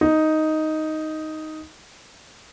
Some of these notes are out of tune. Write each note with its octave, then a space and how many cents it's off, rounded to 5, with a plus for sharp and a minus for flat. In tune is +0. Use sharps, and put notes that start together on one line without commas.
D#4 +5